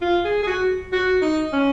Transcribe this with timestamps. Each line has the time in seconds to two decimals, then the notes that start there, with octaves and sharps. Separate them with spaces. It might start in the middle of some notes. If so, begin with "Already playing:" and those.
0.02 F4
0.25 G#4
0.43 G#4
0.47 F#4
0.92 F#4
1.22 D#4
1.53 C#4